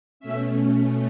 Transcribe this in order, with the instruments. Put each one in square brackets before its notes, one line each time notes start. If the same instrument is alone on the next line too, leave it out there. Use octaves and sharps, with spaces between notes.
[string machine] B2 A3 C#4 E5